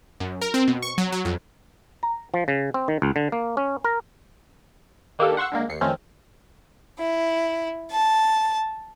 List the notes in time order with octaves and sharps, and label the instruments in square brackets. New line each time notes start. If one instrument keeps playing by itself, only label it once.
[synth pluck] F#2
A#4
C4
B2
C#6
F#3
F#3
F2
[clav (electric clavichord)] A#5
F3
C#3
C4
D#3
C#2
D3
A#3
C#4
A#4
[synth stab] D#3 A#3 D4 G4 A4
F#5 C6 C#6 E6 F#6
D3 G#3 A#3
D#2 C7 C#7
F2 D#3 A3 C4 C#4
[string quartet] E4
A5